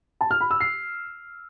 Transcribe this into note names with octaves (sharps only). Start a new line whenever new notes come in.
A5
F6
B5
E6
C7